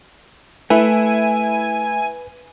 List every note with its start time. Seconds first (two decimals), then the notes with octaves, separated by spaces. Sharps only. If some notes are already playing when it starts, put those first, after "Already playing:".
0.70 A3 E4 B4 G#5